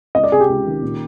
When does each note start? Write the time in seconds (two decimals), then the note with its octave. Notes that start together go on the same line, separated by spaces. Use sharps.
0.15 C#2 D#5
0.24 D5
0.32 C3 G#4
0.40 G4
0.49 C#2
0.66 D#3
0.82 A#2